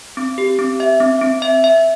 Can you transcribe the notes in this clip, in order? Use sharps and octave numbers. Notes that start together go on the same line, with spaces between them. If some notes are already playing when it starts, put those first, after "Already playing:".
C4
G4
C4
E5
C4
C4
E5
E5